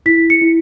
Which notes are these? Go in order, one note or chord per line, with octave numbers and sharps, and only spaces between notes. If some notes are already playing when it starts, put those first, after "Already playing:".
E4 B6
C#7
E4